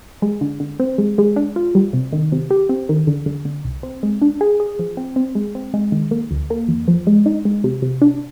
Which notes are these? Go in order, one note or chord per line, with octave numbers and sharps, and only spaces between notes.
G#3
D3
D3
C4
G#3
G#3
D4
F4
G3
C3
D#3
C3
G4
C4
D#3
D3
D3
D3
C2
C4
G#3
D4
G#4
G#4
F3
C4
C4
G#3
C4
G#3
D#3
A#3
D2
A#3
F2
F3
G#3
D#4
G#3
C3
C3
D4